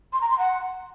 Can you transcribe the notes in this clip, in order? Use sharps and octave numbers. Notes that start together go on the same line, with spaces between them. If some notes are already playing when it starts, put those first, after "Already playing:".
C6
A#5
C6
F#5